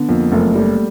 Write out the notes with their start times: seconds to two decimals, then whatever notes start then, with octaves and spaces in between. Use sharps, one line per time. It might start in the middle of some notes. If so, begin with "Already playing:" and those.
Already playing: D3 B3
0.09 F2 A#3
0.32 F#1 A3
0.55 G3 A3